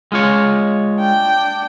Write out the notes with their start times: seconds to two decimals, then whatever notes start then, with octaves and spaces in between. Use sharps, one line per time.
0.12 G#3 F4 C#5
0.98 D4 G5